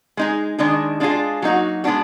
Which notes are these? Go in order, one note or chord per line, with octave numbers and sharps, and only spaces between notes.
G#3 D#4 G#4
D#3 G#3 D4 G#4
G#3 D4 F4 G#4
F#3 A#3 D#4 F#4
G#3 B3 D4 F#4